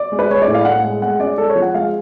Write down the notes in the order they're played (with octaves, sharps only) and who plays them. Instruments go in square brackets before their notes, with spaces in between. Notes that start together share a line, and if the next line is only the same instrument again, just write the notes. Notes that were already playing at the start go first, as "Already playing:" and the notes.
Already playing: [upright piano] D5
G#3
B4
G#3 C#5
D5
A2
F5
A2 F#5
G#3
G#3 F#5
C#4 D5
G#3 A4
C#5
F3
F#5
G#3 F5